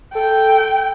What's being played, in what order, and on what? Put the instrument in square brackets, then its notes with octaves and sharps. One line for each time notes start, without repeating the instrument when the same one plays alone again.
[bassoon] A4 [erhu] G5